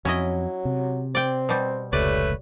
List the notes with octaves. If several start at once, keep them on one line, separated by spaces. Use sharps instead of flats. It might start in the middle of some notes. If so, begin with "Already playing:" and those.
F2 F#3 C#4 E4 D#5
C3
C4 D5 G5
B2 G3
F1 C#2 G3 A3 B4 C#5 D5